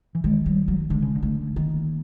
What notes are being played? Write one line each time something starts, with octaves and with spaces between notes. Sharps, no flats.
E3
D#3 G#3
G3
F#3
D3 G#3
C#3
D3
A3
D#3 A#3